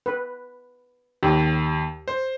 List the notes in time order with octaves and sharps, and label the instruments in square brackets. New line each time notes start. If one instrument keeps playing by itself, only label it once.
[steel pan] B4
[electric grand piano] D#2 [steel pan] G4
[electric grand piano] C5